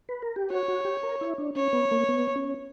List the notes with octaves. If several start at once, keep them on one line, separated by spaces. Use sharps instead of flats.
B4
A#4
G4
F#4 C#5
F#4
G4
A#4
E4
D4
C#4 C#5
B3
A#3
B3
C#4